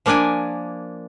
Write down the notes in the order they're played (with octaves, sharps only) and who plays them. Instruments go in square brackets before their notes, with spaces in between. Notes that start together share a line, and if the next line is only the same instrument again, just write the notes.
[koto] F3 A#3 D4 D5 G#5